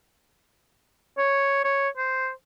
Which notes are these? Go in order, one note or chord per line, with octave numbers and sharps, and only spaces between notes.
C#5
C#5
C5